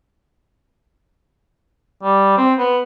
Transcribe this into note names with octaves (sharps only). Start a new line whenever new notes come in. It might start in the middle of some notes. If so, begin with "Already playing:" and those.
G3
C4
B3